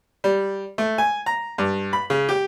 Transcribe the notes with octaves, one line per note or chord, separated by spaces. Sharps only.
G3
A3
G#5
A#5
G2
B5
C#3
G4